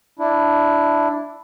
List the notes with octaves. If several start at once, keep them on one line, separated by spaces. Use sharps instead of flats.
D4 E4